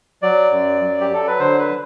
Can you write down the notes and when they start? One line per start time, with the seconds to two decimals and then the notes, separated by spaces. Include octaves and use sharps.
0.22 F#3 D5
0.51 F#2
0.81 F#3
1.01 G4
1.10 F#3 A4
1.27 B4
1.39 D3 C5
1.59 B4